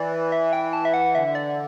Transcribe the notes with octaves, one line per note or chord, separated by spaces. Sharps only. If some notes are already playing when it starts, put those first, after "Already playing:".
Already playing: E3 D5
E5
G5
A5
E5
F#5
D3 E5
D5